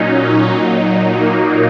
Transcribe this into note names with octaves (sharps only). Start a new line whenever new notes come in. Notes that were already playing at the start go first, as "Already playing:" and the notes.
Already playing: A#2 F#3 C#4 D#4
A#2 F#3
A#3